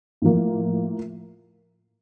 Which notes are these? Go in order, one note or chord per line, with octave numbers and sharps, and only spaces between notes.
A2 F3 A#3